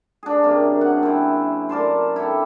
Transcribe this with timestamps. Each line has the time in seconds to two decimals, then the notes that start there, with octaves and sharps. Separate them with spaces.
0.23 D4 G#4
0.43 F#2 C3 A#3
0.81 F#5
1.03 C4 E4
1.69 A#4 D5 A5 C6
2.16 E4 G4 A4